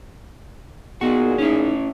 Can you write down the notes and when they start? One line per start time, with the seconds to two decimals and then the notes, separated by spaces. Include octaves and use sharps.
1.01 A#2 B3 D#4 F#4 G#4
1.38 C#4 D#4 E4